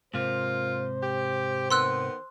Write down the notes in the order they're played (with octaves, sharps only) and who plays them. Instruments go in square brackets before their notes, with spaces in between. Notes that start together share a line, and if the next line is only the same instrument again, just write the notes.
[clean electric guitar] G#2 C3 [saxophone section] A#3 F4 [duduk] C5
[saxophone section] G4
[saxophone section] D#3 B3 [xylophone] C6 E6 F#6